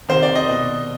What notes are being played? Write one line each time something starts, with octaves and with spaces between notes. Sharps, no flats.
C3 D#3 C5
D5
D#5
B2